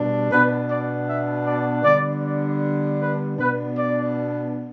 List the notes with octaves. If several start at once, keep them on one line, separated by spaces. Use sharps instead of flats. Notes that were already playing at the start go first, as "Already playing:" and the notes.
Already playing: B2 G3 D4
B2 B3 D4 B4
D5
E5
D5
D3 G3 B3 D4 D5
D5
B4
B2 B3 D4 B4
D5